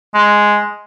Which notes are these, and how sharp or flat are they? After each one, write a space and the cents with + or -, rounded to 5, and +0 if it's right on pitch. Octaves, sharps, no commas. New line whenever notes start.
G#3 +0